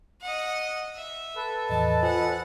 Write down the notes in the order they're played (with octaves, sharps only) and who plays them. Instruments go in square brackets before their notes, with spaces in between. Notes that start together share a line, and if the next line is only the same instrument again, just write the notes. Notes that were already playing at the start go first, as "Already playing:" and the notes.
[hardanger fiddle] D#5 F#5
E5
[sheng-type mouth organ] A4 B4
[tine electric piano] E2 A2 E3 [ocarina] D#5 [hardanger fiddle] A5
[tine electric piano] F4 C5 G#5 [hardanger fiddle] F#5